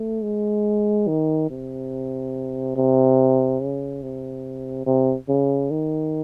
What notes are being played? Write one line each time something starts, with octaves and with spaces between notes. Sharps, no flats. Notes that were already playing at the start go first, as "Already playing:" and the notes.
Already playing: A3
G#3
D#3
C3
C3
C#3
C3
C3
C#3
D#3